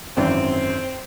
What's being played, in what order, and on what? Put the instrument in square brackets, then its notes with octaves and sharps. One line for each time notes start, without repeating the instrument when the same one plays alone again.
[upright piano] G#1 F#2 E3 [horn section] C4